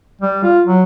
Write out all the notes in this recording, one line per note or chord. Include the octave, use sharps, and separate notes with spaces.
G3
F4
F#3